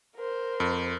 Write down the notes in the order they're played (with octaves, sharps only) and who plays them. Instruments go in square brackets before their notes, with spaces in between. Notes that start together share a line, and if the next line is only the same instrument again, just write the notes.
[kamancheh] A#4 C5
[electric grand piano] F2